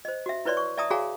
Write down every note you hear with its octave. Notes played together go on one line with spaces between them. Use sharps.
C5 D#5
F#4 E5
E4 B4 C#5 D5 C6
C#6
D5 E5 A5 A#5 D#6
F#4 G#4 C#5 F5 G#5 A#5